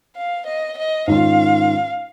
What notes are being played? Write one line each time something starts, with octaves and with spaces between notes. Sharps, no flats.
F5
D#5
D#5
G#2 D#3 C#4 F4 F5